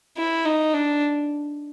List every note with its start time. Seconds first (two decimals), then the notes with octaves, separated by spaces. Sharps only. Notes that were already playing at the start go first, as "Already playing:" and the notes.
0.17 E4
0.45 D#4
0.74 D4